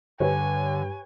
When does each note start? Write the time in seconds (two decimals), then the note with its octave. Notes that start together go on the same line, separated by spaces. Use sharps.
0.20 G2 D3 G4 B4 C#5 G#5